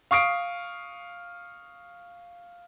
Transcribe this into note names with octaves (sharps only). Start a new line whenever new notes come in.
F5 C#6 D#6 C7 D7